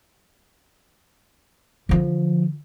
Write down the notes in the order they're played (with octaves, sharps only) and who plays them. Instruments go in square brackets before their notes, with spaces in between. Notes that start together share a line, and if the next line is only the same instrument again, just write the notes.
[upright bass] D3 F3